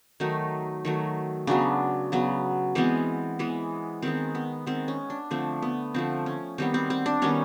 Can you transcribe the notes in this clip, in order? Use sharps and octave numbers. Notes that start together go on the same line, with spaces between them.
D#3 F#3 A3 D#4
D#3 F#3 A3
C#3 F#3 B3 D4
C#3 F#3 B3
E3 G#3 B3 C4
E3 G#3 B3
D#3 G#3 B3 C4
B3
D#3 G#3 B3 C4
C#4
D4
D3 F3 A3 C4
B3
D3 F3 A3 C4
C#4
D#3 G3 B3 C4
C4
C4
D4
D#3 G3 B3 C#4